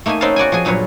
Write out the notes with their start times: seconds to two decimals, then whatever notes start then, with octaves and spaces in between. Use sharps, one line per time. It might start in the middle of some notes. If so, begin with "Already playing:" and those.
0.06 A3 A#3 D#4 E5 G#5
0.21 C4 C#4 D#4 B4 F5 A5
0.36 F#4 D5 G5 G#5
0.52 F3 F#4 G#4 G#5
0.65 G2 A#2 F#3 F4 B4 C#5